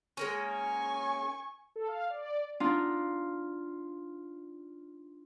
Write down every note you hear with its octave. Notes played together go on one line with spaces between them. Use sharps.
G#3 A#3 C#4
G#5 C#6
A4
F5
D5
D4 D#4 F4